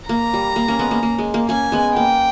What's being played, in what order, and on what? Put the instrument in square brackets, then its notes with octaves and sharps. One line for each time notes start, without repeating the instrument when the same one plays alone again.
[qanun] A#3 [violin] A#5
[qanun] G3
A#3
A#3 C#4
G#3 B3
A#3
A#3
G#3
A#3
[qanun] A#3 C#4 [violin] G#5
[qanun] G#3 B3
[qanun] A#3 [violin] G5